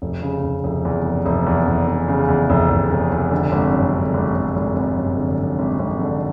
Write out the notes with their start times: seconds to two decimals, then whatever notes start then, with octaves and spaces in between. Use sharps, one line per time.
0.02 F1
0.22 C#3
0.43 F1
0.64 F1
0.85 E2
1.05 F1
1.26 F1
1.46 E2
1.67 F1
1.88 F1
2.08 C#3
2.29 E2
2.50 F1
2.70 F1
2.91 F1
3.11 F1
3.31 D3
3.52 G#1
3.73 F#2
3.94 D3
4.14 G#1
4.35 G#1
4.56 G#1
4.76 G#1
4.97 F#2
5.17 D3
5.37 F#2
5.59 G#1
5.79 G#1
6.00 D3